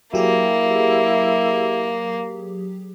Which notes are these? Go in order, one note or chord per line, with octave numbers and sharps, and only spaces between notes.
F#3 A#3 E4 G4 G#4